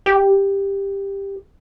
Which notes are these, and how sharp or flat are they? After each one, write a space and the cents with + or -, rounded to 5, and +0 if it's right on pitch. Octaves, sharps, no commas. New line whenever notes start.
G4 +10